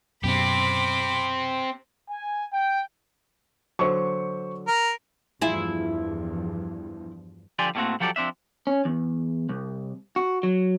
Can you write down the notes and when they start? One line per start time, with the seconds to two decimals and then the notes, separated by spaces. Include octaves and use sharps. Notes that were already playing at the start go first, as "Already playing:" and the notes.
0.24 F#2 B2 C4 G4 B5 D6
2.10 G#5
2.53 G5
3.79 D3 F#3 C5 C#6
4.67 A#4
5.42 E2 G2 F3 E4 F4 G#4
7.59 D3 F3 G4 D5 G#5 C6
7.75 A2 G3 A3 A#3 C4 F#4
8.00 F3 F#3 G4 A4 D5
8.16 F3 C4 D4 E5
8.67 C#4
8.85 E2
9.49 C2
10.16 F#4
10.43 F#3